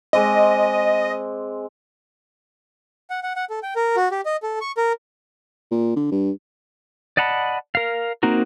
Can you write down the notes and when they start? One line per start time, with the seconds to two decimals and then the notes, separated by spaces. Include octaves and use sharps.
0.13 G#3 C4 D#5 D6
3.10 F#5
3.23 F#5
3.36 F#5
3.50 A4
3.63 G5
3.76 A#4
3.96 F#4
4.11 G4
4.25 D#5
4.43 A4
4.61 C#6
4.77 A#4
5.71 A#2
5.96 D3
6.11 G2
7.17 D5 D#5 F#5 A5 B5
7.75 A#4 F5
8.23 A#3 C4 D#4 F#4 A#4